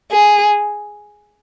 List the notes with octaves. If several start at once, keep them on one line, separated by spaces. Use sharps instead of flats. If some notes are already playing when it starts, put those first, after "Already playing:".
G#4